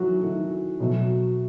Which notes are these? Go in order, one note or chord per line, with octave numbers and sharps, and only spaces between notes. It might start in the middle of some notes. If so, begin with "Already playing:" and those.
Already playing: D#3 E3 F#3 A3 F#4
D#3 A3
B2 F#3 A3